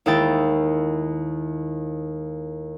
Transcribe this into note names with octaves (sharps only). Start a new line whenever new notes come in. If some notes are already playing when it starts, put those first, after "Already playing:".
D#2 G#3 E4 G5 A6